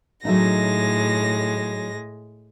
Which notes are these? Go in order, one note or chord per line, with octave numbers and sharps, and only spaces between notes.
A2 F#3 G#3 A3 D#4 A#6